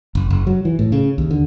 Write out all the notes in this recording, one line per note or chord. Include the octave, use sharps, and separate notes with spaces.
F#1
F#1
F#3
E3
A2
C#3
D#2
D3